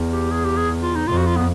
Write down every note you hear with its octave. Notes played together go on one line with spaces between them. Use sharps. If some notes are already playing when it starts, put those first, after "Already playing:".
Already playing: E2
G4
G#4
G4
G#4
F4
D#4
F2 F4
F#4
F4
B3